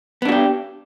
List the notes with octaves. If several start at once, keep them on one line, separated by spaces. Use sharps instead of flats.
B3 D4 F#4 G4